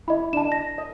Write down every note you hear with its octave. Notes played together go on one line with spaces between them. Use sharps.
E4 D#5 B5
D4 A5 E7
A#6
D#5